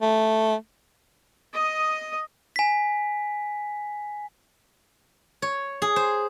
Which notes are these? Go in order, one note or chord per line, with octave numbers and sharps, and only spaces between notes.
A3
D#5 D#6
G#5 B6
C#5
G#4
C5